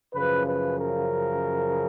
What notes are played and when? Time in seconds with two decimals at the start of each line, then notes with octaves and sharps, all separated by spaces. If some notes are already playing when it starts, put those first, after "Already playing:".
0.14 F#2 C#3 F3 B4
0.46 B4
0.79 A#4